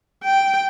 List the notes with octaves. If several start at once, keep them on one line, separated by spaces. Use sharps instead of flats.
G5